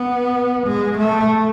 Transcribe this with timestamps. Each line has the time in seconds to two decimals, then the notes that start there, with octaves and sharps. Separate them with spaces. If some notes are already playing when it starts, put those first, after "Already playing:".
Already playing: B3
0.67 G#3
0.97 A3